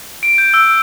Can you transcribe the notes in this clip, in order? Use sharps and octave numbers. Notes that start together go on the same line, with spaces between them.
D7
G6
E6